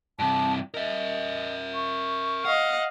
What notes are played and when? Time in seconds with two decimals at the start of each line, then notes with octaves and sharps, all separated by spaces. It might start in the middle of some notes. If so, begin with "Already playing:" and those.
0.19 G2 C3 A5
0.74 A#4 D#5 E5
1.75 C#6
2.45 D#5 F5 F#5